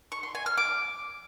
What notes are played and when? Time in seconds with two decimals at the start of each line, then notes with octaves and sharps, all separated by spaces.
0.12 C#6
0.23 C6
0.35 G#5
0.46 F6
0.58 D6